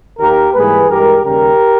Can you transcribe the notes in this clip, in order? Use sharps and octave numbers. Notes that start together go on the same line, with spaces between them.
D#2 D#3 A#3 G4 A#4
G#2 E3 G3 A#3 G#4 B4
G2 E3 G#3 G4 A#4
D#2 C#3 G3 G4 A#4